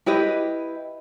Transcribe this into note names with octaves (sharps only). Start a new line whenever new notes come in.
E4 G4 B4 D#5